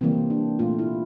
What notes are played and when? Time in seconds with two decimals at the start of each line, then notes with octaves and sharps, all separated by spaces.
0.01 C3 E3 G3 A#3 C4
0.30 D4
0.59 A#2 A3 F4
0.79 E4